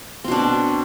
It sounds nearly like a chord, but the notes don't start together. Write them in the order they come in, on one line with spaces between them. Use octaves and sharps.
C4 B2 D4